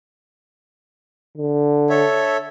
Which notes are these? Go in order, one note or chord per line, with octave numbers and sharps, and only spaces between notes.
D3
A4 C#5 E5